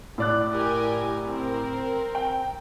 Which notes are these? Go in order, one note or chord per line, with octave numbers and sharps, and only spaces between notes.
A2 D5 F#6
G4 A#4 G#5
C4 A#4
G5